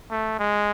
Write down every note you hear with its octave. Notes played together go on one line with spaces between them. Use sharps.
A3
G#3